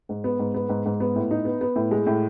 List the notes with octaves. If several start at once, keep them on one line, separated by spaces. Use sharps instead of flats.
G#2
B3
G#2
B3
G#2
G#2
B3
A2
D#4
B3
B3
A2
G#3
A2